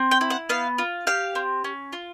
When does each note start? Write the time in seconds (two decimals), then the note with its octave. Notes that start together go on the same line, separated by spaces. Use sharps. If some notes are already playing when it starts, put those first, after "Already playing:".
Already playing: C4
0.11 G5
0.21 E4
0.30 F#5
0.49 B3 F5
0.78 F4
1.07 G4 F5
1.35 C4
1.64 C#4
1.93 F4